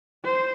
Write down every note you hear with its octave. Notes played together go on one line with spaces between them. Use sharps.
C5